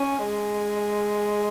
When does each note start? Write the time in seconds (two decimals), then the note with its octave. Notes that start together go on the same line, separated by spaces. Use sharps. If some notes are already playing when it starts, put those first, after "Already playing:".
Already playing: C#4
0.26 G#3